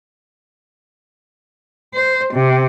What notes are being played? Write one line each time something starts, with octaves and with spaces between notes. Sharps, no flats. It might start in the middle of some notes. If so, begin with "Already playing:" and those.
C5
C3